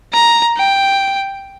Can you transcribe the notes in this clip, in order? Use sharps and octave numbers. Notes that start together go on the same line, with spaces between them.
A#5
G5